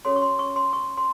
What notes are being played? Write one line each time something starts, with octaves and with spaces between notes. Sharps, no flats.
C#4 F#4 A4 C#5 C6
C#6
C6
C#6
C6
C#6
C6